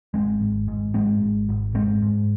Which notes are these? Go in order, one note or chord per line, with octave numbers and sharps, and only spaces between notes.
G#1 G#3 C4
G#1
G#2
G#2 G#3 C4
G#1
G#1
G#2 G#3 C4
G#2